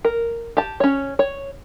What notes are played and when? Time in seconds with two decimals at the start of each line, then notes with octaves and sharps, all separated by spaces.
0.05 A#4
0.57 G4 A5
0.80 C#4 C#5
1.19 C#5